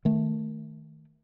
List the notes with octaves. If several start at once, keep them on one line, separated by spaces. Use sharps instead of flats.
D#3 A3